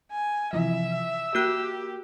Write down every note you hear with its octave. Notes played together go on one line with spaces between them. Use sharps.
G#5
C3 E3 F3 E5
E6
A#3 F#4 G4 F#6